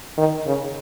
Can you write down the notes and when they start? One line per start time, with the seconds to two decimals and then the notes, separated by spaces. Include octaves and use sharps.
0.17 D#3
0.46 C#3